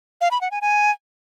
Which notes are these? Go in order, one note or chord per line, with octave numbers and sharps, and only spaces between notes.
F5
B5
F#5
G#5
G#5